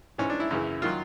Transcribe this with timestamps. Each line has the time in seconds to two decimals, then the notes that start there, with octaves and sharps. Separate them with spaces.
0.18 G#2 E3 C#4
0.30 D4
0.40 E4
0.51 F#2 C#3 E3
0.82 D#3 F#3 F4